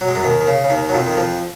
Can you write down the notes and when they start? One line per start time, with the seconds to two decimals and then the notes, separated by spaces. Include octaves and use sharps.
0.01 F#3
0.08 G#3
0.15 F#2 F#3
0.23 D#2 D#3
0.41 D#3
0.48 C#3
0.64 C#3
0.70 D#2 D#3
0.89 F#3
0.94 F2 F3
1.07 D#3
1.17 F2 F3